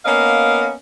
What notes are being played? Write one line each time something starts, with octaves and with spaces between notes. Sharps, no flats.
A#3 B3 C#4 A#4 D#5 F5